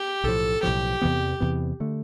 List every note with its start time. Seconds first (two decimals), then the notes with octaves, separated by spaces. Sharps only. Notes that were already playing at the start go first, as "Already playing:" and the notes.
Already playing: G4
0.24 B1 A2 F3 A4
0.63 B1 A2 F3 G4
1.01 E2 C3 E3 B3
1.40 E2 C3 E3 B3
1.80 D3 A3